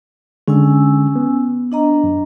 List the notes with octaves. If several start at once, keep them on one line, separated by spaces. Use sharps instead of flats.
D3 G#3 C#4 G#5 E6
B3
D4 D#5 A#5
F#2